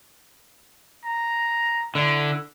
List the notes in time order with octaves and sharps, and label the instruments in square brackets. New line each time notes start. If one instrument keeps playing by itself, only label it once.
[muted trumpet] A#5
[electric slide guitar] D3 [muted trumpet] E4